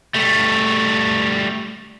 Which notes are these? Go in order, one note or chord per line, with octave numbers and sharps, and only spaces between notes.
G3 A3